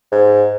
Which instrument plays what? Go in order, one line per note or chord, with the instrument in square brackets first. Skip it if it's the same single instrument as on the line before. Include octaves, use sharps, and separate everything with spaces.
[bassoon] G#2